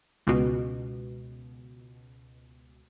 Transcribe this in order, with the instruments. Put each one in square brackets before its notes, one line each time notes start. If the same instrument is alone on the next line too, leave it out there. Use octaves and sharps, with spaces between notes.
[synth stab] C#2 B2